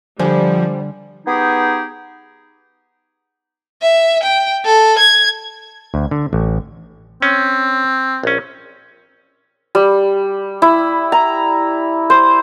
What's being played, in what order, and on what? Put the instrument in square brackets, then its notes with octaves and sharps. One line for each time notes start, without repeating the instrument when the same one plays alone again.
[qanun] D3 [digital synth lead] F3 [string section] G3 [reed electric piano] C5 D5 G#5
[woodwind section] B3 D#4 G4 G#4
[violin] E5
G5
A4
G#6
[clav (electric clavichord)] D2
D3
A1
[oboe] C4 [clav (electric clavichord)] C#4
[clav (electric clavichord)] A#1 C#4
[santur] G3
E4
A#5
C5